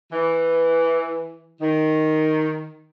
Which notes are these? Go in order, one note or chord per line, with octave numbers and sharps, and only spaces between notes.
E3
D#3